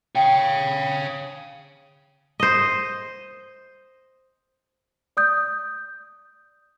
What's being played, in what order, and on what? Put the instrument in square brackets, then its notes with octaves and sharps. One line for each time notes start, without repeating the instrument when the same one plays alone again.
[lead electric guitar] C#5 F5 [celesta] G5
[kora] C5 D#5
[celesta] D5 D#6 G6